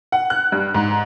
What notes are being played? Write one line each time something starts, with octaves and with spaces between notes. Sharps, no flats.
F#5
F#6
G2
G#2